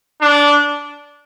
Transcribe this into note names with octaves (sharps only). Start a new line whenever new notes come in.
D4